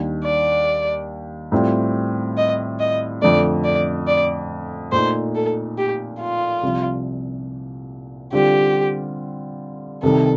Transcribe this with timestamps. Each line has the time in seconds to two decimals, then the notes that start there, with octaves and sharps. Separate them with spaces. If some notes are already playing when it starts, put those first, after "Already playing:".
Already playing: D#2 D#3 G3 D4
0.24 D5
1.52 A2 G3 C4 F4
2.37 D#5
2.80 D#5
3.22 F2 D3 A3 D5
3.64 D5
4.07 D5
4.92 A#2 A3 D#4 C5
5.35 A4
5.77 G4
6.20 F4
6.63 C2 C3 F3
8.32 D3 G3 C4 F4 G4
10.03 C2 C3 D#3 A4